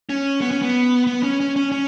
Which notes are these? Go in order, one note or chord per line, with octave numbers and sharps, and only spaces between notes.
C#4
B3
C#4
B3
B3
C#4
C#4
C#4
C#4